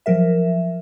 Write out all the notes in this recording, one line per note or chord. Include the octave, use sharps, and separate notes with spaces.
F3 F#3 A#4 E5